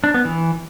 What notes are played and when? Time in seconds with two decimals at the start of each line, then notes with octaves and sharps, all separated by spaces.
0.04 D4
0.14 B3
0.25 E3